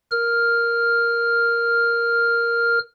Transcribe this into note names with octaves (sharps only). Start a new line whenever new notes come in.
A#4 F6